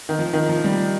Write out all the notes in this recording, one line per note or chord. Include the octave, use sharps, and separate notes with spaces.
D#3
F3
D#3
F3
G3